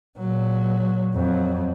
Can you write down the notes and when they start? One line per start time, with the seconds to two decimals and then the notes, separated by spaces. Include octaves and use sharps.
0.17 A#2 F#3
1.14 F2 F#3